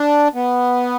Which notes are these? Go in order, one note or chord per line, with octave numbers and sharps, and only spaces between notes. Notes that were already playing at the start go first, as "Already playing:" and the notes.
Already playing: D4
B3